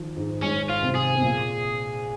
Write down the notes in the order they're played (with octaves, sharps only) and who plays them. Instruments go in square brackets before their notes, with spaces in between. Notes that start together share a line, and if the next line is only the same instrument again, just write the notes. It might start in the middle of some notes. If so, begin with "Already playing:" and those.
Already playing: [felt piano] D#3 F3
G#2 G#3
[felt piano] G#2 G#3 [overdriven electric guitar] C#4
[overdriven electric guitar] F4
[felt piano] C3 C4
[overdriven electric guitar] G#4
[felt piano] C4
A#2 A#3